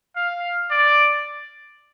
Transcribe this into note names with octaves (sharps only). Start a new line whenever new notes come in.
F5
D5